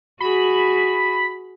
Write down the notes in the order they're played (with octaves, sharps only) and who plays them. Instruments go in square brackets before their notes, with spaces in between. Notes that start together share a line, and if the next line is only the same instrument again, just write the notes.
[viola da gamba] F#4 G#4 [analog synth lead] B5